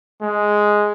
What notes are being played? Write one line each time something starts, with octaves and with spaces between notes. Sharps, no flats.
G#3